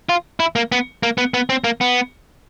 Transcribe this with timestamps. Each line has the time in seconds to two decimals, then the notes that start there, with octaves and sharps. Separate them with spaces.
0.09 F4
0.40 E4
0.56 A#3
0.72 B3
1.03 A#3
1.18 B3
1.34 B3
1.50 C4
1.64 A#3
1.81 B3